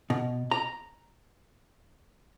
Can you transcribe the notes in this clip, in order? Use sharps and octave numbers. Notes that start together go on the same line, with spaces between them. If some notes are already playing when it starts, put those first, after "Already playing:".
B2
A#5